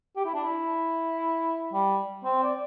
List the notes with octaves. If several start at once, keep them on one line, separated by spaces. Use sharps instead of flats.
G4
E4
D4
E4
G3
C4
D5